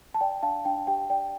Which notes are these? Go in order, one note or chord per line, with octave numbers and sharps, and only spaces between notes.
A5
D5 G5
D4 F5 A5
D4 G5
G4 G5
D5 G5